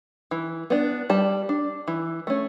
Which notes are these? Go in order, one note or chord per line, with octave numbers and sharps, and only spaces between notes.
E3
B3 D4
G3 A5
D4
E3
A3 C#4